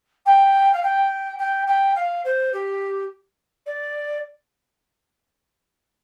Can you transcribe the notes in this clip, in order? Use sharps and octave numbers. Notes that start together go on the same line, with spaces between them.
G5
F5
G5
G5
G5
F5
C5
G4
D5